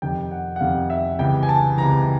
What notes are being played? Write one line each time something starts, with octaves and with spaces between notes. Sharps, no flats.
F2 C3 D#3 G5
F#5
F#5
F2 C3 D#3 F5
E5
C#2 C3 E3 G5
G#5
A5
C#2 C3 E3 A#5